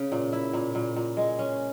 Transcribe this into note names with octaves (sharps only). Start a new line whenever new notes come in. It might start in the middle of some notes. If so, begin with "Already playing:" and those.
Already playing: C#3
A#2
E4
A#2
A#2
A#2
G#3
C#4